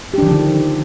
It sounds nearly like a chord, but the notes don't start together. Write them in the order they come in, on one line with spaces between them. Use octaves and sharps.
G4 D4 D#3 F3 D3